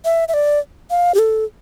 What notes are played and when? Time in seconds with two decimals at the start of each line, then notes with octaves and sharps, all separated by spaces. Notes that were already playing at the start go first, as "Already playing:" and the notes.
0.05 E5
0.28 E5
0.34 D5
0.90 F5
1.14 G4
1.19 A4